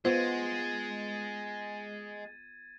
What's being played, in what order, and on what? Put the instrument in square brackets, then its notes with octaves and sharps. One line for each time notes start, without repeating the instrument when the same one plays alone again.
[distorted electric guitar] G#3 [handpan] B3 F4 [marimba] C5 [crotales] G#6 A6 D#7